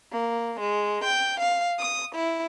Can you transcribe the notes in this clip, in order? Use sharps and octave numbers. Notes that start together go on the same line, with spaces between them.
A#3
G#3
G5
F5
D#6
E4